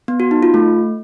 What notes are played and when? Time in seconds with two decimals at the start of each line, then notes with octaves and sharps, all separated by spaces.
0.08 B3
0.20 F#4
0.31 D#4
0.43 F4
0.54 A3